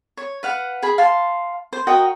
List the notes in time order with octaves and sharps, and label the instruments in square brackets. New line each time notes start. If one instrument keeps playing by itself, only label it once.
[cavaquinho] C#5
B4 F5 F#5
G#4 B5
F5 A5 C6
C5
F#4 A#4 D#5 G5